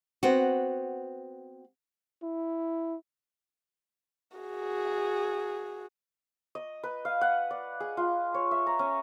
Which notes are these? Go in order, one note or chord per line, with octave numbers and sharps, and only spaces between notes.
B3 C4 F#4
E4
F#4 G#4
D#5
B4
F5
F#5
D5
G#4
F4
C#5
E5
A#5
C#4